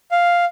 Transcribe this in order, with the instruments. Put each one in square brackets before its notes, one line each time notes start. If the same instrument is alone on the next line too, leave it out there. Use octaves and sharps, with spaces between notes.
[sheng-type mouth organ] F5